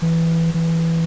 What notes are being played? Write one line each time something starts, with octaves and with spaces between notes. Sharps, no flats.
E3
E3